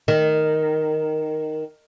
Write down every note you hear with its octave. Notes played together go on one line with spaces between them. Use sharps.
D#3